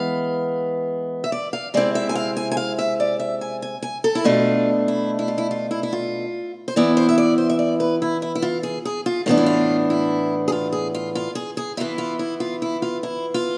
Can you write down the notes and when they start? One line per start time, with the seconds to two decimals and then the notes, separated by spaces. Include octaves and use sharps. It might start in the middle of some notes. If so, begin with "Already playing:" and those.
Already playing: E3 G#3 B3 F5
1.24 E5
1.32 D5
1.53 F5
1.74 C3 G#3 C4 E4 D5
1.95 E5
2.09 G#5
2.15 F5
2.37 G#5
2.51 G#5
2.57 F5
2.79 E5
3.00 D5
3.20 E5
3.41 G#5
3.62 G#5
3.82 G#5
4.04 A4
4.15 E4
4.24 B2 A3 D4 F4
4.88 E4
5.19 E4
5.28 F4
5.38 E4
5.51 F4
5.71 E4
5.83 E4
5.93 F4
6.68 C5
6.76 E3 B3 E4 D5
6.97 C5
7.09 E5
7.18 D5
7.38 C5
7.50 E5
7.59 D5
7.80 B4
8.02 E4
8.22 E4
8.35 E4
8.42 F4
8.63 G#4
8.85 G#4
9.06 F4
9.26 A2 E3 B3 D4 F4
9.37 E4
9.46 F4
9.90 E4
10.48 G#4
10.52 F4
10.72 G#4
10.94 F4
11.15 F4
11.35 G#4
11.57 G#4
11.77 E3 B3 E4 F4
11.98 F4
12.19 E4
12.40 F4
12.62 E4
12.82 F4
13.03 E4
13.34 F4